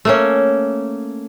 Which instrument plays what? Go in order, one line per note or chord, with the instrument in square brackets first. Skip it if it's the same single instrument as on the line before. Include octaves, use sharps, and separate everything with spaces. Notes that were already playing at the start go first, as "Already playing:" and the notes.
[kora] A3 A#3 C#4